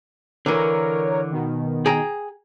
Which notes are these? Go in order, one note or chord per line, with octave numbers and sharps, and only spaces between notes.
D3 E3 A#4 C#5
B2 D#3
G#4 G5 A#5